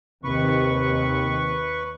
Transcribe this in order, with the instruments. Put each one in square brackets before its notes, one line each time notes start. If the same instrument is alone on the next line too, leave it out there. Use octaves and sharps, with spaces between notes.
[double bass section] D#2 [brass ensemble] C3 D#3 [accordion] B4 C#6